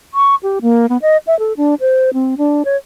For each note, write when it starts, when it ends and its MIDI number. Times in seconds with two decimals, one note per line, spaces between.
0.14 0.35 85
0.43 0.59 67
0.62 0.86 58
0.89 0.97 59
1.02 1.17 75
1.27 1.38 76
1.39 1.53 69
1.57 1.75 62
1.80 2.10 72
2.14 2.35 60
2.38 2.63 62
2.65 2.76 73